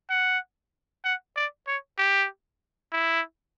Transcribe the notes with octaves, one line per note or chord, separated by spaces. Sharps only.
F#5
F#5
D5
C#5
G4
E4